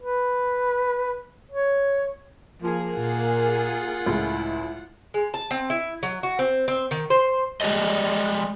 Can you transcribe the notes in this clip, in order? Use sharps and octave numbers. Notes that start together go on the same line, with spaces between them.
B4
C#5
F3 A#3 G#4
A#2 F4 F#5
C#2 A2 G#3 E4
G#3
A5
C4
E4
F#3
F#4
C4
C4
D#3
C5
G#3 G4 A4 D5 D#5